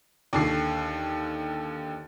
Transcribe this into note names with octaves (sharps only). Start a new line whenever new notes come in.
D#2 D3 C7